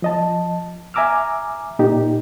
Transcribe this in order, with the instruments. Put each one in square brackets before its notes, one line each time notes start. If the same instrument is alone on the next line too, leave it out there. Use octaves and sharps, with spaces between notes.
[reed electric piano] F3 D#5 A5
E5 G#5 A#5 D6 E6 F6
A#2 D#4 G4